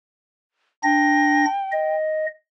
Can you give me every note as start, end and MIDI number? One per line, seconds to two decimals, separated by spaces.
0.83 1.45 62
0.83 1.96 79
0.83 1.45 94
1.72 2.26 75